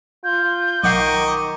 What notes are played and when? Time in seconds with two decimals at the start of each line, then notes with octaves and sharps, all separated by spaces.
0.24 F4 G6
0.83 B1 D#3 D#5 F#5 C#6 D6 C7